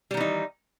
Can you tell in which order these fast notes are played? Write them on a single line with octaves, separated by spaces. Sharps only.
G3 D#3 E3 D#4